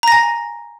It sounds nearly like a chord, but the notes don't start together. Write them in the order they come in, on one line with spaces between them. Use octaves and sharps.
A#5 A#6 G#5